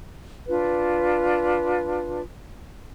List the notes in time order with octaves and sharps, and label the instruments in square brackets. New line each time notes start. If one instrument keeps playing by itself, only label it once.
[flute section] D4 F4 B4